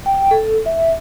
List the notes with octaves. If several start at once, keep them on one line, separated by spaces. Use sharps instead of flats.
G5
A4
E5